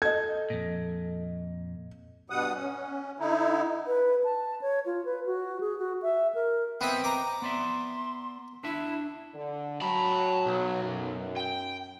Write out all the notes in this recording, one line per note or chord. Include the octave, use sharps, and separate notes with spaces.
A4 D#5 G#6
F2 A#2
G2 B2 G3 F#5 D#6
C#4
D3 D#4 E4
B4
A5
C#5
F4
B4
F#4
G#4
F#4
E5
A#4
B3 C4 C5 D#5 E5 G5
A#5 D6
B3 D5 E5 C6
D4 E4 E5
D3
F#3 A5 B5
B1
F#2
G5